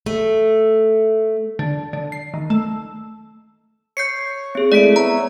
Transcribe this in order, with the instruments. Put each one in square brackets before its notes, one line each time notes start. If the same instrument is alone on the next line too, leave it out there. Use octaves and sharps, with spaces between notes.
[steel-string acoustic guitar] A3
[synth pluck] D3
D3
C7
D#3
A3
[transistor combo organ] C#5 [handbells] G6 C7 C#7
[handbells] C4 G#4
[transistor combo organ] G#3 A3 E4 [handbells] D5 B6 D7
[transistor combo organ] B3 C#5 E5 [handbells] A#5